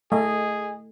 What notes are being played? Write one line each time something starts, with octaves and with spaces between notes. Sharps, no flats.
A3 G#4 D#5